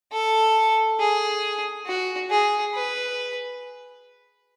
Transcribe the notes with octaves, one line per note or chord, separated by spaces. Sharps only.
A4
G#4
F#4
G#4
B4